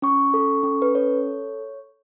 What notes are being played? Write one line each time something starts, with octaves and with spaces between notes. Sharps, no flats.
C#4 C#6
A4
C#4
B4
A4 C#5